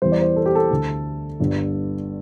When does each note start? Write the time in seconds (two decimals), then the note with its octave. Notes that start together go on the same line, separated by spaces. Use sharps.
0.02 E2 E3 G3 C5
0.12 D5
0.21 C5
0.36 A4
0.46 G4
0.55 A4
0.71 D2 D3 A3
1.40 G1 G2 D3 G3